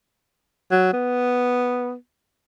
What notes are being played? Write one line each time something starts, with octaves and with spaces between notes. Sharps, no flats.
F#3
B3